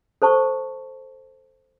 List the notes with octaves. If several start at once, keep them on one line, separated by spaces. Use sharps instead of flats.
A4 C5 A5 C#6